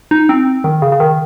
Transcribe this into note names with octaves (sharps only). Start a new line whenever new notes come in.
D#4
C4
D#3
C#3
C#3
D#3